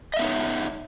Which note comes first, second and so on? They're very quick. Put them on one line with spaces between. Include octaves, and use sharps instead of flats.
D#5 E5 B3 D#4 C#5